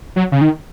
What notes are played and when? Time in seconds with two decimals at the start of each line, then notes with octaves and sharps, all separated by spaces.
0.16 F#3
0.32 C#3
0.41 D#3